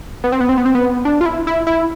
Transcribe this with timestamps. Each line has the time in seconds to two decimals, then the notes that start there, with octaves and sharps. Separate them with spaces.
0.24 B3
0.32 C4
0.41 B3
0.49 C4
0.58 B3
0.66 C4
0.75 B3
1.05 D4
1.21 F4
1.26 E4
1.47 E4
1.67 E4